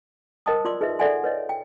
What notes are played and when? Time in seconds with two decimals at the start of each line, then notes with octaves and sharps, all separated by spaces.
0.46 A#4 C5 D#5 G5 A5 D#6
0.65 F4 D5 C6 D6 E6
0.81 D#4 G#4 B4 D#5 E5
0.99 A4 D5 E5 F#5 G#5 C6
1.24 B4 C#5 D#5
1.49 G5